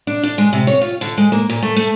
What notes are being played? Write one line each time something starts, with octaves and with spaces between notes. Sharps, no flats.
D4
D4
G#3
C3
C#5
F4
D3
G#3
A#3
A#2
A3
A3